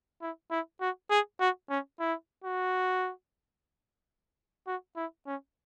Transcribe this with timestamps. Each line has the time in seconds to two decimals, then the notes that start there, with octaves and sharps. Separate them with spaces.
0.22 E4
0.51 E4
0.81 F#4
1.10 G#4
1.40 F#4
1.70 C#4
1.99 E4
2.44 F#4
4.67 F#4
4.96 E4
5.26 C#4